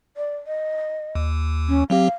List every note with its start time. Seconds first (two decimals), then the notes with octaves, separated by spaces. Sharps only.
0.17 D5
0.47 D#5
1.15 D#2
1.69 C#4
1.90 F#3 C4 G4 F5